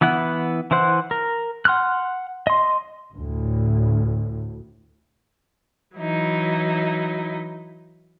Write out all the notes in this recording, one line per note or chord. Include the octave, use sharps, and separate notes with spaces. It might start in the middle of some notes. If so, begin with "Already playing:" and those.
E3 B3 E4 F#5
E3 E4 C5 F#5
A#4
F#5 C6 F6 F#6
D#5 C6
D2 A2
E3 F#3 D#4 E4